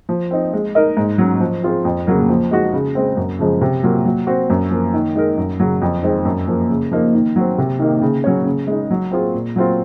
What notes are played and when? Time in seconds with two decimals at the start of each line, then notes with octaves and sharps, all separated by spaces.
0.09 F3
0.31 C4 D#4
0.53 G#3
0.75 D#4 A#4 D#5
0.97 G#2
1.18 F#3 C#4
1.40 F3
1.63 C4 F4 G#4 C5
1.85 F2
2.07 C#3 F#3 A#3
2.29 F3
2.51 G#3 D#4 F#4
2.73 C#3
2.95 G#3 C4
3.17 F#2
3.39 C#3 F3 G#3
3.61 C3
3.83 F#3 A#3 F4
4.05 F#3
4.27 C4 F#4 C5
4.50 F#2
4.71 F3 A#3
4.94 D#3
5.15 G#3 D#4 A#4
5.38 F#2
5.60 C#3 F#3
5.82 F2
6.03 D#3 G#3 C4
6.25 F#2
6.47 F3 A#3
6.70 C#3
6.91 F3 A#3 D#4
7.14 D#3
7.36 F#3 C4
7.58 C3
7.79 D#3 A#3 D#4
8.01 C#3
8.24 F#3 C#4 G#4 C#5
8.45 C#3
8.67 G#3 D#4
8.90 F#3
9.11 C4 F4 G#4
9.34 A#2
9.56 F#3 C4 F4